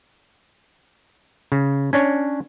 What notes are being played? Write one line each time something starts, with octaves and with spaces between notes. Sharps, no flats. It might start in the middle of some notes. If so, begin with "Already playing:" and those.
C#3
C#4 D4 C#5